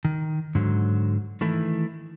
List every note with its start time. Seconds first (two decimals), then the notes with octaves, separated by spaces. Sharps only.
0.05 D#3
0.55 G#2 D3 F#3
1.41 D#3 E3 A3 E4